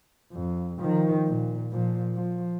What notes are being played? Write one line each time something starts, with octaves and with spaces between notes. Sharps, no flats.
F2
D#3 F3
A#2
A#2 F3
F3